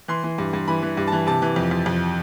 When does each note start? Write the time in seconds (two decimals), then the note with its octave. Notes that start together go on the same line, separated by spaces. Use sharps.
0.08 E3 C6
0.24 E3
0.38 G2
0.53 G2
0.68 E3 B5
0.82 E3
0.97 G2
1.07 A5
1.12 E3
1.27 C3 A5
1.42 E3
1.56 F2
1.71 F2
1.86 F2